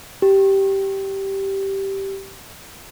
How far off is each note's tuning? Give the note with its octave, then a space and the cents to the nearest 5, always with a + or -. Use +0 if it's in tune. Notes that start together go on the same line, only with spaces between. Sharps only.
G4 -10